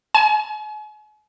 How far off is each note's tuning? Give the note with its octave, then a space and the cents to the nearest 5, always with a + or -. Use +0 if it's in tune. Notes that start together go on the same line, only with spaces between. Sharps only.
G#5 +40